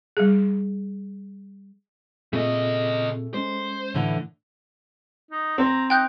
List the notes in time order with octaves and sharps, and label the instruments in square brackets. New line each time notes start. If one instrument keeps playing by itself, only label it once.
[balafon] G3 G#4
[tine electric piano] A#2 C4 G#4 [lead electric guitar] C#3 D#5 [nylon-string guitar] A3
[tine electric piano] G#3 C#4 [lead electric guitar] C5
[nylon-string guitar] A2 D3 E3
[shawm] D#4
[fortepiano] C4 [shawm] A#5
[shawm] D#4 [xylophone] G5 F#6 G6